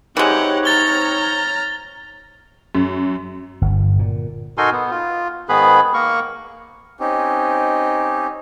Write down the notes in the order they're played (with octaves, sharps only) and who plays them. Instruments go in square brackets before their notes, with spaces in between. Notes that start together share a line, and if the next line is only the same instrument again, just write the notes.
[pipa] E3 G#3 [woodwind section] C4 D#4 C#5 [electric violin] G4 F#5
[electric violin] A#5 F6 [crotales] A6 G7
[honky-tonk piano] F#2
[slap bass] G1
A#2
[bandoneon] D#4 F#4 A4 A#4 G#5 C6
B3
F4
G#2 D#3 B3 G#4 B4 B5
A#3 A#4 C#6
[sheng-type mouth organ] C4 C#4 D#4 G4